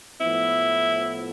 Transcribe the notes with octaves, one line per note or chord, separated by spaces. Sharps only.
A2 F3 B3 E4